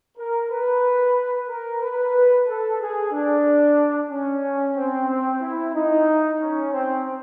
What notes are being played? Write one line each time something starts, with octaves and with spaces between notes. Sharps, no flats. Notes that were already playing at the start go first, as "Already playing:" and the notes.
A#4
B4
A#4
B4
A4
G#4
D4
C#4
C4
C4
E4
D#4
C#4
C4